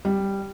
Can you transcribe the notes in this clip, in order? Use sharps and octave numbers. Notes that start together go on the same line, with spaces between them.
G3